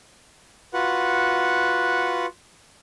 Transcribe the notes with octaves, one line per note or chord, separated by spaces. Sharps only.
F4 F#4 B4 F#5